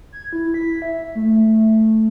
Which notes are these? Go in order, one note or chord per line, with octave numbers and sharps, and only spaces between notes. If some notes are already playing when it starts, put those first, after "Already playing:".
G#6
E4
B6
E5
A3